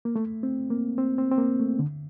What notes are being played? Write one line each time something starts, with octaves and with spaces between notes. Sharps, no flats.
A#3
A3
C4
A#3
C4
C4
C4
A#3
A3
D3